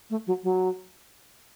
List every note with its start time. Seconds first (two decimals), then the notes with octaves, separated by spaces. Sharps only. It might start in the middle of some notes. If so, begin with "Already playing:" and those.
0.10 A3
0.27 F#3
0.43 F#3